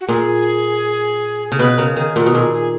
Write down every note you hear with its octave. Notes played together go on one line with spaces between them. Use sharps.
F#4
A#2 G#4
C#3
B2 B4
C#3 A#4
D#3 G#4
A#2 F#4
B2
A#2 G#4
G#4